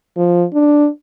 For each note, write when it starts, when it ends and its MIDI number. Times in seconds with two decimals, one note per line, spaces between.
0.17 0.45 53
0.54 0.88 62